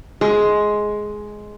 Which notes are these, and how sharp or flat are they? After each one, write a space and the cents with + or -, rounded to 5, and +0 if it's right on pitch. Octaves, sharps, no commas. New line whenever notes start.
G#3 +10